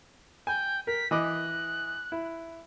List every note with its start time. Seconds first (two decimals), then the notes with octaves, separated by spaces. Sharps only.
0.47 G5 G#5
0.87 A#4 B6
1.11 E3 D#5 D6 F#6
2.12 E4